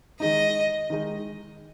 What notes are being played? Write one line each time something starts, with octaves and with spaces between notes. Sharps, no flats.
D#3 G#3 D#4 D#5
D#3 G#3 D#4